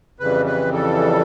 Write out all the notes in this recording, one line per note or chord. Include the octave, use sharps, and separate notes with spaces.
F2 C#3 E3 G3 B4
B4
A4